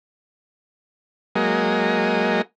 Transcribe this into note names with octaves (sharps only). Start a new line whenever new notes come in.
F#3 G#3 A#3 D#5